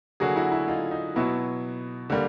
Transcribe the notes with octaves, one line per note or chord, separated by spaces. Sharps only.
D3 F#3 A#3 F#4 G#4
E4 F#4
E4
D#4 F4
D#4
B2 F#3 B3 E4
D3 G3 A#3